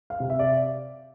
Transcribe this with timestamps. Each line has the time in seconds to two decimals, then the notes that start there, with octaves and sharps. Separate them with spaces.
0.10 F5
0.20 C3
0.30 E5
0.39 D5